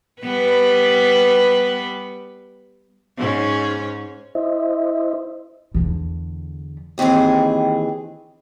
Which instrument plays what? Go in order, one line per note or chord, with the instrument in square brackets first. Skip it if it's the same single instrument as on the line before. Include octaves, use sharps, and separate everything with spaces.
[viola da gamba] G3 B3 B4
G#2 C#4
[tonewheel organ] E4 C5 D#5 E5
[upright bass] E2 D3
[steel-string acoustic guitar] D#2 D#3 E3 C4 G#4